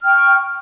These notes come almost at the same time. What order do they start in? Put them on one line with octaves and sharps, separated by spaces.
F6 G5 C#6